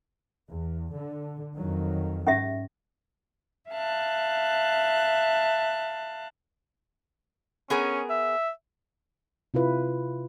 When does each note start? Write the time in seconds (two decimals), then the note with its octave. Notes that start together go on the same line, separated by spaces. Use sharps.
0.48 E2
0.93 D3
1.54 F2 D#3 F#3
2.27 G#2 C#4 G4 E5
3.70 E5 F5 A5 F#6
7.70 B3 C#4 G#4 A#4
8.10 E5
9.54 C3 E4 F4 B4